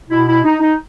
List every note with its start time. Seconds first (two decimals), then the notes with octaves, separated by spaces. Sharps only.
0.10 B2 E4
0.27 E4
0.44 D#4
0.61 D#4